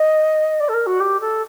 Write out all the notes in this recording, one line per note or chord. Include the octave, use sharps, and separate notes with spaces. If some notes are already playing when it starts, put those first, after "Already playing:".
Already playing: D#5
D5
A4
A#4
F#4
G4
A4